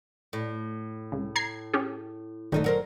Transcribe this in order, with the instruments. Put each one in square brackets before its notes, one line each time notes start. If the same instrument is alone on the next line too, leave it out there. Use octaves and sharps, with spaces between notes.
[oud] A2
[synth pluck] C#2
A#5 G#6 C7
C#4 G4 G#4
[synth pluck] G1 A#2 D#3 [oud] D2 D#4 A4
[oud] F#3 A#4 C5